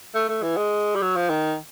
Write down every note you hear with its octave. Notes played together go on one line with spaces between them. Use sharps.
A3
A3
E3
G#3
G3
F#3
F3
D#3